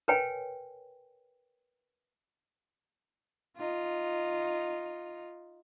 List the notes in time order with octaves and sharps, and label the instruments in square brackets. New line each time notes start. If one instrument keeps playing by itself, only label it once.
[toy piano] A#4 B4 C#5 G5 G#5
[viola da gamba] D#4 F4